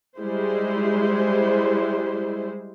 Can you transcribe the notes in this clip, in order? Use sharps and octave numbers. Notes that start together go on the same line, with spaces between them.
G3 G#3 E4 C5